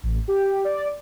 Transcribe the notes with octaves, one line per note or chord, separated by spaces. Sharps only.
A1
G4
D5